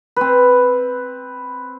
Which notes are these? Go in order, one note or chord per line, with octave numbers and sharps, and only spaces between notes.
C4 B4